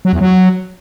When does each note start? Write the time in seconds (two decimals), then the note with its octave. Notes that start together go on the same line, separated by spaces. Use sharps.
0.05 F#3
0.13 E2
0.21 F#3